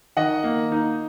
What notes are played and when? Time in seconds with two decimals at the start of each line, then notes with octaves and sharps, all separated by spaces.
0.17 D#3 D#5 F#5
0.44 A#3
0.72 D#4